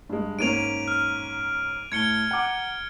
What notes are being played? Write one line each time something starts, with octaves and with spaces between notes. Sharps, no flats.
G2 G#3
G#2 A#3 C#4 D7 D#7 F7
F6
A2 G#6 C#7 G7
F#5 A#5 D6